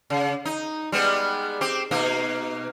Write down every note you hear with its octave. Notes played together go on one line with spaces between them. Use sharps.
C#3
D#4
G3 G#3 B3
C4 G4
B2 A#3 D#4